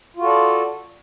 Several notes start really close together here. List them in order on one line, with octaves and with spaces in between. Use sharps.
F4 F#4 A4 D5